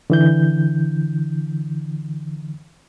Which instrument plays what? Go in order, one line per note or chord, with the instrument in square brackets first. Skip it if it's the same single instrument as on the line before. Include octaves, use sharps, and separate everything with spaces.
[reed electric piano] D3 E3 G6